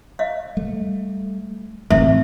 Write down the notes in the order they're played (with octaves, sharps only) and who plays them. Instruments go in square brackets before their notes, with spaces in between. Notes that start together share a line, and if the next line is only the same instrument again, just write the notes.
[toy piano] D#5 F5
[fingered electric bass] G3 A3
[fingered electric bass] A1 E3 C4 [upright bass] A3 [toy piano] E5